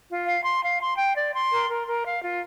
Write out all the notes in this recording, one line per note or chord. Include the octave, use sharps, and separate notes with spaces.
F4
F5
C6
F5
C6
G5
D5
C6
A#4
A#4
A#4
F5
F4